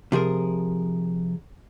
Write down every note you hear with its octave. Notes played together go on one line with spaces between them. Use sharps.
C3 F3 G#4 A#4